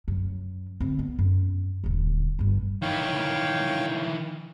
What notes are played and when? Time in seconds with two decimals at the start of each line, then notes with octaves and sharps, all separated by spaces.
0.08 F#2
0.80 D3 C4
0.99 B3
1.19 F#2
1.84 D#1 D3
2.39 G1 G2
2.82 D#3 E3 C#5 F5 G5